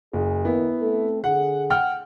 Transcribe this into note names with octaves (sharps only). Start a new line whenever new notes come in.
F#1 G#4
D#2 B3 E4 A#4
A3 C4 A4
D3 G#4 F#5
F#5 G5 F6